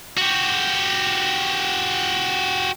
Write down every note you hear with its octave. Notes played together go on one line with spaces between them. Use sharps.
F#4 G4